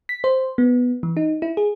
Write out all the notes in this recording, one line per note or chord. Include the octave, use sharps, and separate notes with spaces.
B6
C5
B3
E3
D#4
E4
G#4